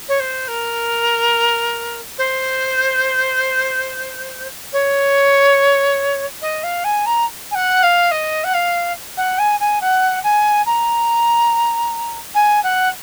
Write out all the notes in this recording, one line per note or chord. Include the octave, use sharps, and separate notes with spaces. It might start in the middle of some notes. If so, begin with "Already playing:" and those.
C#5
C5
A#4
C5
C#5
D#5
F5
G#5
A#5
G#5
F#5
F5
D#5
F#5
F5
F#5
G#5
G#5
F#5
G#5
A#5
G#5
F#5